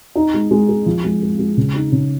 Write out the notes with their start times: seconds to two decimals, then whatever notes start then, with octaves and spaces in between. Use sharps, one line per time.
0.15 D#4
0.34 G#3
0.51 G#3
0.69 G#4
0.86 F3
1.04 G#3
1.22 G#3
1.39 G#3
1.57 C#3
1.75 D#4
1.92 C#3